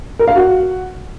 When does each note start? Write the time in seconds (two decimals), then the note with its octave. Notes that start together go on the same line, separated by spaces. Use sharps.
0.19 A#4
0.28 F5
0.36 F#4